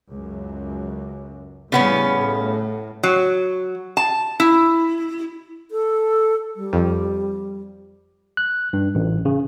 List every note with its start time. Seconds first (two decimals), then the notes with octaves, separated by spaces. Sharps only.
0.10 C#2 F#2
1.72 A1 C#3 E3 G3 B3 C#4
2.15 A2
3.03 F#3
3.97 A5
4.40 E4
5.71 A4
6.56 G3
6.73 F2
8.37 F#6
8.73 G2
8.95 A1
9.25 C#3